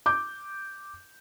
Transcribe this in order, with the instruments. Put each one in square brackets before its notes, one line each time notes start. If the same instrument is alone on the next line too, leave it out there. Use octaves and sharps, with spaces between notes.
[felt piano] D6 G6